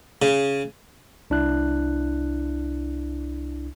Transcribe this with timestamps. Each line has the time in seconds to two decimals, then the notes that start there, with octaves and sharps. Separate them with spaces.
0.22 C#3
1.30 C2 D4 E4 F#6